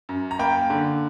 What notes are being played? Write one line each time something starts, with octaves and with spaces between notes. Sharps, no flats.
F#2
A#5
A#3 G5 B5
D3